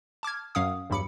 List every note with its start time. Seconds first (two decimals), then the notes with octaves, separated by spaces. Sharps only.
0.23 A5 D6 F6 G#6
0.55 F#2 F#3 C#4 F5 F#5 D#6
0.90 E2 G2 F#3 B5 D6 C#7